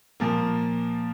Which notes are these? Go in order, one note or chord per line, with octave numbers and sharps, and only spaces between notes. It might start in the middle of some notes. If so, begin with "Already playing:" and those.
A#2 F3 A#3